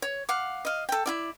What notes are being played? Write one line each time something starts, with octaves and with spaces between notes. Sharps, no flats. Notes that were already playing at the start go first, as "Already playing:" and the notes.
C#5
F5 F#5 D6
D#5 F5
A4 G5
E4 F4 D5